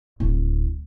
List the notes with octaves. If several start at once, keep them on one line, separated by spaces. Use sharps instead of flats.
D1